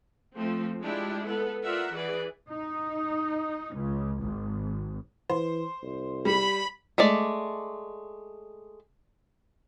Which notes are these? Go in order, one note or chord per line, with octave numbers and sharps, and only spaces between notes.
F3 A3 C4
G#3 D4 E4 F4 G4
B3 A4
F4 A#4 D5 E5 F#5
E3 G#4 B4 D5
D#4
C#2
G#1
E3 C5
C2
G3 B5
G#3 A3 D5